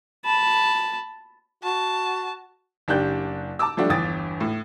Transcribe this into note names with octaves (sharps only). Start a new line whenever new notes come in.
A5 B5
F#4 A5
F#1 D4 G4 F#6 G6
A5 A#5 D6 E6
F3 G3 A3 D4 F#4
G1 E2 G5 D#6 A6
A2